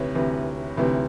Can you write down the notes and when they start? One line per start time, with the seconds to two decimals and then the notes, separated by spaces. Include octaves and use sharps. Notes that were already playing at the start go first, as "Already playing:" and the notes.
Already playing: D2 C3 E3 B4 C#5
0.15 D2 C3 E3
0.77 D2 C3 E3